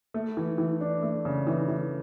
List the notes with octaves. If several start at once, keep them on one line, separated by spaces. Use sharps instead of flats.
A3
E3
E3
D4
A3
C#3
E3
E3